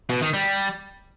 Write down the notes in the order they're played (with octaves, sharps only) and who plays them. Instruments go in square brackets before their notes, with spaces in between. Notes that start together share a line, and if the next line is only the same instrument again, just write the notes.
[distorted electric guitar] B2
D#3
G3